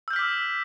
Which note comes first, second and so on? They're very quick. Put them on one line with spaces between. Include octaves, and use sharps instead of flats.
E6 G6 F6 B6 D6